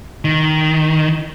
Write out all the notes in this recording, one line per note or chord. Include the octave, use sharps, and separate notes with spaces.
D#3